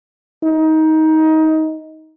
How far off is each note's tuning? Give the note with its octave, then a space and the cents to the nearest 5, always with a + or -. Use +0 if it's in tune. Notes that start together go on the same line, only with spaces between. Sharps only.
D#4 +20